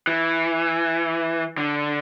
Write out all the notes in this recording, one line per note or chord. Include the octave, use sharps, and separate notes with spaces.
E3
D3